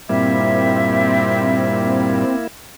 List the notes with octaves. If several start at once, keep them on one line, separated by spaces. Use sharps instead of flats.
G2 A#2 G3 A#3 C4 E4 E5